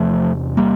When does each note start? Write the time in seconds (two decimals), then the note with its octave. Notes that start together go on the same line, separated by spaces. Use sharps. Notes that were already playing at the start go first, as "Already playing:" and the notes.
Already playing: E2 C3 F3 A3
0.57 G3 A#3